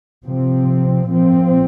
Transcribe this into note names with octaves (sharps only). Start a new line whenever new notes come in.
C3 F3 C4
A#2 F3 C4